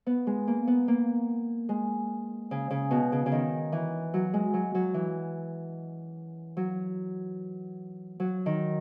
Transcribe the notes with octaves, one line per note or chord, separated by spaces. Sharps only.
B3
G#3
A#3
B3
A#3
G#3
C#3
C#3
B2
C#3
C#3
D#3
E3
F#3
G#3
F#3
F#3
E3
F#3
F#3
D#3